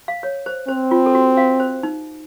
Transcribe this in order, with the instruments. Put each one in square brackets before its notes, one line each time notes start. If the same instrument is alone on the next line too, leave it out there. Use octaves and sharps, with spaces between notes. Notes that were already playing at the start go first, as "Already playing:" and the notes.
[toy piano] F5
C#5
C5
[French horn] C4 [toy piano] C5
[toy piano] F4
A4
F#4
F5
C5
D#4